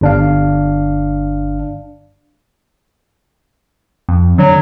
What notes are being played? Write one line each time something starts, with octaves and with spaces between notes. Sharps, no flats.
G1 D4 F5
F2
D3 F#3